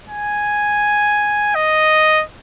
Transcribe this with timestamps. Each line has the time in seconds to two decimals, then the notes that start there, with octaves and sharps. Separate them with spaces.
0.09 G#5
1.55 D#5